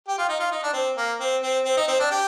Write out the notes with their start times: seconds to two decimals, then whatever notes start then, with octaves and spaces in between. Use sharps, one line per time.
0.08 G4
0.18 F4
0.29 D#4
0.40 F4
0.52 D#4
0.63 D4
0.73 C4
0.97 A#3
1.20 C4
1.43 C4
1.65 C4
1.77 D#4
1.88 C4
1.99 D4
2.11 G4